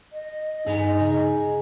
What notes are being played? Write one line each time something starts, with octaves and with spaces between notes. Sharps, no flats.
D#5
G2 D3 B3 D4 D#4 G#4
C#3 G#4